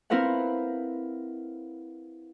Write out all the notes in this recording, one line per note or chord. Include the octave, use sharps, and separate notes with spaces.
C4 E4 A#4 B4 F5 F#5